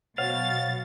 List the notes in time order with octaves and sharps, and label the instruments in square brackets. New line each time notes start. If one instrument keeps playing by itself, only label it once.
[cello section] B2 F#3 [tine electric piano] C5 C#5 F#5 [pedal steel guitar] F5 [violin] A6